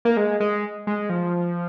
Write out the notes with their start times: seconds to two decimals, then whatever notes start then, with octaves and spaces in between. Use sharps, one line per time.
0.05 A#3
0.17 G#3
0.40 G#3
0.87 G#3
1.09 F3